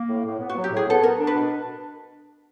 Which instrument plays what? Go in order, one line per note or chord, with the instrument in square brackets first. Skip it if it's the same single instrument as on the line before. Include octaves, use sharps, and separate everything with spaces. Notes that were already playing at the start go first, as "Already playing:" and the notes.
Already playing: [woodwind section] A#3
A2
A2
B3
[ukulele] F#4
[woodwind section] F#3
[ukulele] G4
[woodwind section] A2 [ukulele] G#4
[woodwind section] B3 [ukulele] A4
[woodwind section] B3 [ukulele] A#4
[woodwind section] D4
[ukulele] B4
[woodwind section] B2